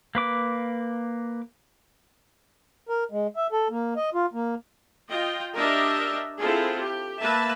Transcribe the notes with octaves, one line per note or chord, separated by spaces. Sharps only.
A#3 B4 D6
A#4
G#3
E5
A4
A#3
D#5
F4
A#3
F4 D#5 G5
D4 G4 A#4 D#5 E5
C4 E4 F4 G#4 A4
G4
A#3 B4 E5 A5